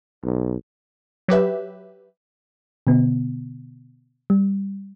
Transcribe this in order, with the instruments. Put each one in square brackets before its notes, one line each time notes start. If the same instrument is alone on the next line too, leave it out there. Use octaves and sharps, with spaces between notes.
[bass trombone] B1
[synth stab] F#3 G4 B4 E5
[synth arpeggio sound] B2 D3 B3
G3